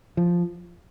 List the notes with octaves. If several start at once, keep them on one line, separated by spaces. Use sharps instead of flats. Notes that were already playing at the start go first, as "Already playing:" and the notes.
F3